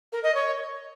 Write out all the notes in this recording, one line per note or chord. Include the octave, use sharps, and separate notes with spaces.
A#4
D#5
C#5